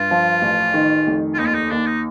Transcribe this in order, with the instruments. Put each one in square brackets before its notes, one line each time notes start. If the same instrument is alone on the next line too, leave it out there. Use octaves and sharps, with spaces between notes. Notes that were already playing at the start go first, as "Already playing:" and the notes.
Already playing: [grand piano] G2 [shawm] F4
[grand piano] F3
A1
D#3
F1
[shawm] F4
[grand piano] D#2 [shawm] D#4
[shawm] F4
D#4
[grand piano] D#2 [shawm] D4
[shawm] D#4